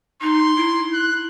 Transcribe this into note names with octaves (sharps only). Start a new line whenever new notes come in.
D#4 C6
E4
F#6